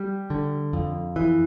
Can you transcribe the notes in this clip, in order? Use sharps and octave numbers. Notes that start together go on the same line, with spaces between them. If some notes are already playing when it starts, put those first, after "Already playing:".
Already playing: G3
D3
F2
E3